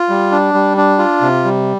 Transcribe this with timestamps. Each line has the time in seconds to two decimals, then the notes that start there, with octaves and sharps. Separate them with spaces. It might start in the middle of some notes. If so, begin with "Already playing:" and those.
Already playing: F4
0.09 G3
0.32 D4
0.54 G3
0.77 D4
0.98 F4
1.22 C3
1.44 G3